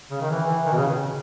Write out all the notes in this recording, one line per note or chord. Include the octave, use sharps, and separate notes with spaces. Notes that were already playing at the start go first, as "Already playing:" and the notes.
C#3
D#3
E3
E3
D#3
B2
C#3